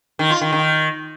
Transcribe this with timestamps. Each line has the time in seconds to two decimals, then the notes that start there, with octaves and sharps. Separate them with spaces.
0.19 D#3
0.30 F4
0.41 D#3
0.52 D#3